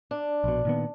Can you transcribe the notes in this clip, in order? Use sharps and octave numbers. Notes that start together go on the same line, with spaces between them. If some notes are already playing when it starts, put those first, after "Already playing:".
D4
A#1 B2
A#2 D#3 B3